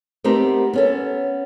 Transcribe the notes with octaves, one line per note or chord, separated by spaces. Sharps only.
A3 B3 C4 D#4 G4 A#4
B3 C#4 A4